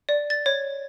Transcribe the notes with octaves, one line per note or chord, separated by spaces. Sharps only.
D5
A6
C#5